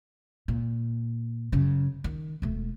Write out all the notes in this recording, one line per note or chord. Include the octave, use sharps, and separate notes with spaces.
A#2
F#2 C#3
D#3
E1 A3